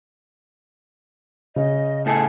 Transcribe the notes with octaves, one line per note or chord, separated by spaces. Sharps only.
C#3 D#5
A2 A3 G#4 A5